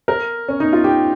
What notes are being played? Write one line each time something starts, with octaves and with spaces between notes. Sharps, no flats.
A#4
C#4
D#4
F4
G4